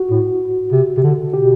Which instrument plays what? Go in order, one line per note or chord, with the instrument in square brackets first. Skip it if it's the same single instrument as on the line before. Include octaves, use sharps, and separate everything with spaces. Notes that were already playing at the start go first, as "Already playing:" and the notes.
Already playing: [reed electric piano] F#4
[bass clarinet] A2
C3
C3
D3
[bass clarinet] B2 [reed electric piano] G4